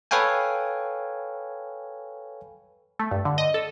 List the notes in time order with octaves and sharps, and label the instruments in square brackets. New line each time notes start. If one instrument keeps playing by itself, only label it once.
[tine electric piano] A4 B4 C#5 F5 G5 G#5
[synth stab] A3
G2
D3
D#5
A4